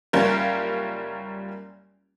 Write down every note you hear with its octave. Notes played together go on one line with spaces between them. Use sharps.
F#1 G3 C#4 F4 A#4